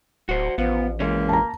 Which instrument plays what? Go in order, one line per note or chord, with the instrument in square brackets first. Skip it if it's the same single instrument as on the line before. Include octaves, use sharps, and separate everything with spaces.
[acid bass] D1 [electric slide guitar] F#4 C5
[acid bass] A1 [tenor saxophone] F3 [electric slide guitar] B3
[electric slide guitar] E3 G#3 C#4 [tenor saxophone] A#3
[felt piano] A5 A#5